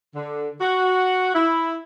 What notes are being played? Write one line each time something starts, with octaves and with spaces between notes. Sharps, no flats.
D3
F#4
E4